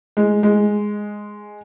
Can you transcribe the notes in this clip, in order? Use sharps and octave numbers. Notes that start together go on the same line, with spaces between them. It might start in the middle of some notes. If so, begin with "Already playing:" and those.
G#3
G#3